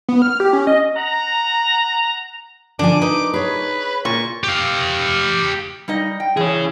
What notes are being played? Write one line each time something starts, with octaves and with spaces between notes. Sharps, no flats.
B3
F6
G4
C#4
D#5
F#5 A#5
D3 F3 D4 G#5 D6
D#4 B4
G#4 B4 C#5
A#2 C#6
G4 F5
G3 D#4 D#5
G5
E3 G#4 C#5